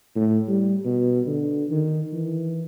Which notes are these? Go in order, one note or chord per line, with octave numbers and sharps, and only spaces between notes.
A2
G3
B2
D3
D#3
E3